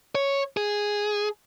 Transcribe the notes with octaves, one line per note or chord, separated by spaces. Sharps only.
C#5
G#4